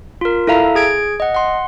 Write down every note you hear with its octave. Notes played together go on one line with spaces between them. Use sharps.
F4 A#4
E4 A4 E5 F5 A#5
G#4 G#6 D7
D#5 F#5
F#5 C6